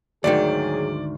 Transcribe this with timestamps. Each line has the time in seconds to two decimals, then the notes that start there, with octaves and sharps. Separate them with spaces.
0.24 D2 G#2 D#3 F#3 G#4 D5